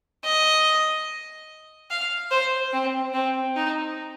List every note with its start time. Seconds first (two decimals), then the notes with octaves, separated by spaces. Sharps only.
0.25 D#5
1.91 F5
2.31 C5
2.73 C4
3.14 C4
3.56 D#4